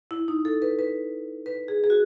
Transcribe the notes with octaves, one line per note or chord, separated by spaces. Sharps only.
E4
D#4
A4
B4
B4
B4
G#4
G#4
F#4